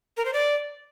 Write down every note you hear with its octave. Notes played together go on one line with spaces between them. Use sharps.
A#4
C5
D5